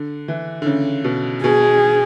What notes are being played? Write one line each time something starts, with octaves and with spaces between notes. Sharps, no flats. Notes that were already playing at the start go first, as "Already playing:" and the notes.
Already playing: D3
E3
D3
C#3
B2
B2 G#4